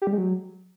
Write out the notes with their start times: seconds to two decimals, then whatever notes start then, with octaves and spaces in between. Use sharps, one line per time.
0.02 G4
0.07 G3
0.13 G#3
0.18 F#3